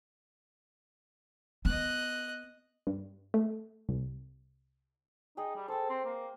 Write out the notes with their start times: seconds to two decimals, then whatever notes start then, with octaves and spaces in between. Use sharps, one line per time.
1.65 B3 D#5 F#6
2.87 G2
3.34 A3
3.89 C2
5.37 D#4 G#4 G5
5.56 G3
5.68 A4 C5 G5
5.89 C4
6.05 A#3